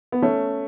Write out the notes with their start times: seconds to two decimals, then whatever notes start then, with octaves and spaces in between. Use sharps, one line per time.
0.12 B3
0.22 A3 C#4